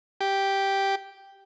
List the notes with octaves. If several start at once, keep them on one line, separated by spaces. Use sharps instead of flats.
G4